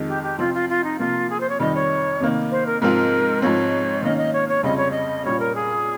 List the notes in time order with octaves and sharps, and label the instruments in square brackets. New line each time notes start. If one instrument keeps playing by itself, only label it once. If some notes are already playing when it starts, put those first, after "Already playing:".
Already playing: [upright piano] F2 D#3 G#3
[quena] G4
G4
[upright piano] C3 F3 C4 [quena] F4
[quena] F4
F4
D#4
[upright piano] C3 F3 A#3 [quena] F4
[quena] G#4
C5
C#5
[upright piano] F2 D#3 G3 [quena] D#5
[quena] C#5
[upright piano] C3 D#3 A#3
[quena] C5
A#4
[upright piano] G#2 F3 C4 F4 [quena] A#4
[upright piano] G#2 F3 C4 [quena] C#5
[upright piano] D#3 A#3 C#4 [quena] D#5
[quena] D#5
C#5
C#5
[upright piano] F2 C#3 G3 C4 [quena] D#5
[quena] C#5
D#5
[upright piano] A#2 G3 C#4 [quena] C#5
[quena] A#4
G#4